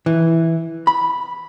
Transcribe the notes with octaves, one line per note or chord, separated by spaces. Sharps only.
E3
B5